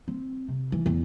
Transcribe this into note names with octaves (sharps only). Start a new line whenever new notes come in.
C4
C3
E3
E2